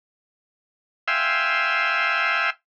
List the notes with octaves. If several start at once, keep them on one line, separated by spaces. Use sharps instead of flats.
E5 F5 G5 G#5 C6 E6